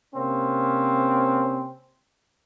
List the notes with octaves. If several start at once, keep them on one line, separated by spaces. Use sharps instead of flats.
C3 A#3 C4 C#4